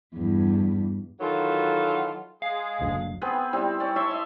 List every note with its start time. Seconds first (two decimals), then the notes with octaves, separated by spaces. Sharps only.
0.15 E2 G2
1.20 D#3 E3 F#3 F4 F#4 A4
2.42 G#3 G#4 F5
2.81 F#1 D2
3.21 B3 C4 G#4 B4
3.33 B5
3.53 G3 C4 E4
3.80 C#4 D5
3.96 C#5 E5 A5 C6
4.11 D#5 E5